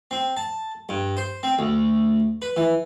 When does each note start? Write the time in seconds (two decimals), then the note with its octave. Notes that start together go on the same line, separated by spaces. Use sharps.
0.11 C4
0.37 A5
0.89 G2
1.17 C5
1.43 C4
1.59 D2
2.42 B4
2.56 E3